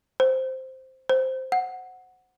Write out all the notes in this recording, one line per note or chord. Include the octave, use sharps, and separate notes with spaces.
C5
C5
F#5